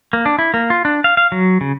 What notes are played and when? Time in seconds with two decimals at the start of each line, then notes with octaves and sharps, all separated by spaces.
0.13 A#3
0.26 D4
0.39 E4
0.54 A#3
0.70 F4
0.85 D4
1.04 F5
1.17 F5
1.32 F#3
1.61 C#3